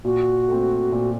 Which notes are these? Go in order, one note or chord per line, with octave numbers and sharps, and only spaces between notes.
A#2 F#4
A3 C4
A#2